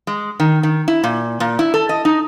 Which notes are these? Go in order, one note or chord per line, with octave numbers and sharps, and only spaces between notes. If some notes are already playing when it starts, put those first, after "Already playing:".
G#3
D#3
D#3
E4
A#2
A#2
E4
A4
D#5
D#4